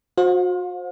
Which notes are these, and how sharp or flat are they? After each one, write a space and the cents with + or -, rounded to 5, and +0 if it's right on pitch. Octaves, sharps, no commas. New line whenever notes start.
F#4 -35 C5 +15 F5 +40